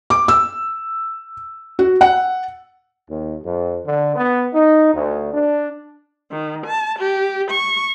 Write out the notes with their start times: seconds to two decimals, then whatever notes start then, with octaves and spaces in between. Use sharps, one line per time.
0.10 D6
0.28 E6
1.79 F#4
2.01 F#5
3.09 D#2
3.43 F2
3.85 D3
4.16 B3
4.54 D#4
4.93 D2
5.33 D4
6.31 D#3
6.65 A5
6.99 G4
7.51 C#6